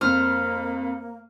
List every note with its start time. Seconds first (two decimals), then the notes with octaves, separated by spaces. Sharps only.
0.01 F2 A#3 C5 F6